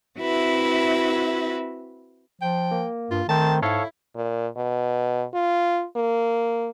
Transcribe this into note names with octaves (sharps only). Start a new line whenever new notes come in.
C4 E4 F#4 B4 E5
F3 G5
A#3
G2 F4
D#3 A3 C4 C5 A5
G#2 E4 A4 C#5 F5
A#2
B2
F4
A#3